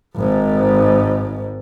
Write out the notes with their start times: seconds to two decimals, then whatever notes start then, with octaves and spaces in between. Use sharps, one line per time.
0.16 G#1 G#2